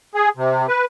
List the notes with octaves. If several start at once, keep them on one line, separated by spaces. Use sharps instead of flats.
G#4
C3
B4